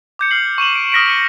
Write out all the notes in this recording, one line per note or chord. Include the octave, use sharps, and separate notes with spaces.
D6 G6 C#7
F6 G6 C7 F#7
C#6 D#7 E7 F#7
D7
D#6 F6 A#6 B6 D7
C#7 D#7 F#7